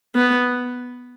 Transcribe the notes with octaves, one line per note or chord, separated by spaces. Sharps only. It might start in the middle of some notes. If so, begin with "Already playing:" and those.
B3